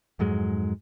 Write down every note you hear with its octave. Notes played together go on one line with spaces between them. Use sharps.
F2 G#2 F#3 G#3